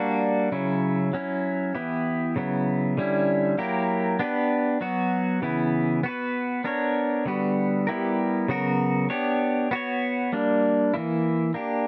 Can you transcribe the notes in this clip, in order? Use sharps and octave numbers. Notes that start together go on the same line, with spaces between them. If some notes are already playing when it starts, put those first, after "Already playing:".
Already playing: G3 A#3 D4 F#4
C#3 F#3 C#4 E4
F#3 C#4 E4
E3 B3 E4 G4
C#3 F#3 B3 E4
D3 G3 C#4 E4
F#3 A#3 E4 G4 A#4
B3 D4 G4 B4
F#3 B3 F#4
C#3 E3 B3 E4
B3 F#4 B4
B3 D4 A#4 C#5
D3 G3 B3 F#4 B4
G3 B3 E4 G4 A#4
C#3 F#3 B3 F#4 A#4
B3 D4 G4 C#5
B3 F#4 C#5
G3 A#3 D4
E3 A#3 E4
A#3 D4 G4